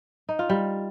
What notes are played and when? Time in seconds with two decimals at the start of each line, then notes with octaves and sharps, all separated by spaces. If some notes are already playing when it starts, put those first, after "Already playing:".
0.29 D#4
0.39 F4
0.49 G3